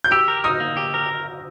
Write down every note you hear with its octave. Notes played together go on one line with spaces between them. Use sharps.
G6
G4 E6
A#4
D#4 D#6
A#3
G4
A#4